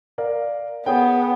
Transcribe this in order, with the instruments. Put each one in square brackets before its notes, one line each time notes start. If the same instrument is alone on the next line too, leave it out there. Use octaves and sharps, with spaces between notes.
[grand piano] A#4 D5 F5
[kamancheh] B3 [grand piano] G#4 C#5 G5